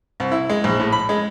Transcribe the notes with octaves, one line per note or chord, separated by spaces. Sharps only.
C2
E4
G#3
A#1
A2
B5
G#3